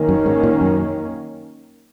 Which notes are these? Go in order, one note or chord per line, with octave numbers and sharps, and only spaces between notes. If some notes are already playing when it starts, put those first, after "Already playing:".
Already playing: D#3 A#3 C#4
F#2
G#2
A#2
F#2